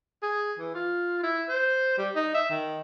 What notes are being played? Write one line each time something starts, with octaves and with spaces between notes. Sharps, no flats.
G#4
E3
F4
E4
C5
G3
D#4
E5
D#3